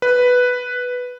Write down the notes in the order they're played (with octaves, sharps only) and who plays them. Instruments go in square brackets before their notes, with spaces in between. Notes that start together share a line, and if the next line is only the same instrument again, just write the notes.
[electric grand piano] B4